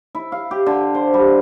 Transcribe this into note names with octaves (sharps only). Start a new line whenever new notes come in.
E4
F5
G4
D3
C5
G3